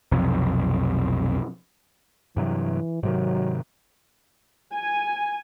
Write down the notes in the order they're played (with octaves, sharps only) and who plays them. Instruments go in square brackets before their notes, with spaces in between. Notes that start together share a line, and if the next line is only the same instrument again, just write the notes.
[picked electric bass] B1 F2 C3
[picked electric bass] G2 C3 F#3 [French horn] E3
[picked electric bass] G#2 C3 D#3 [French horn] F#3
[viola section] G#5